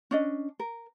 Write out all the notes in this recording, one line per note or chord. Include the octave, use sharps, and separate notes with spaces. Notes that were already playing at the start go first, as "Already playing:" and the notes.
C#4 D4 D#5
A#4